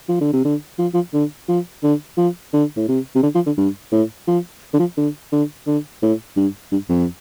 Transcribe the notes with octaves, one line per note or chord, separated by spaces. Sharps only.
F3
D3
C3
D3
F3
F3
D3
F3
D3
F3
D3
A2
C3
C3
D3
F3
D3
G2
A2
F3
D3
F3
D3
D3
D3
A2
G2
G2
F2